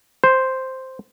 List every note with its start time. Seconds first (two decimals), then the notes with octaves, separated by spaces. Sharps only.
0.24 C5